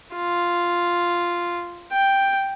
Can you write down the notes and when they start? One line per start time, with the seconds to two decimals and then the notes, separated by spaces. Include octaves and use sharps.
0.15 F4
1.93 G5